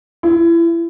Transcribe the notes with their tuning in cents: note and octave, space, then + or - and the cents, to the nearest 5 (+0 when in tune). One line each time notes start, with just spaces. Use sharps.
E4 +30